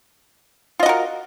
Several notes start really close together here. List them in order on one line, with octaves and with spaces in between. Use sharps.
F4 D#5 F#4 A#4